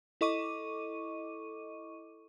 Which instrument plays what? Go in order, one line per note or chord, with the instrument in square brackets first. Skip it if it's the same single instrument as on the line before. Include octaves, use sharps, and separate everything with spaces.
[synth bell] E4 A4 D#5 C#6 D6 D#7